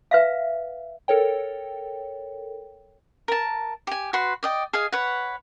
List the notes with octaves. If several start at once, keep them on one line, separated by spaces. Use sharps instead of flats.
B4 E5 F5
A4 A#4 C#5 G5
A#4 A5
G4 G#5
F#4 B4 C6
D5 D#5 G5
G#4 D#5 F5 G#5
B4 C#5 F#5